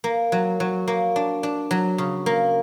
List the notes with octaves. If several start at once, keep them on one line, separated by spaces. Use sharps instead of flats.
A#3
F#3
F#3
A#3
D4
D4
F#3
C#3
A#3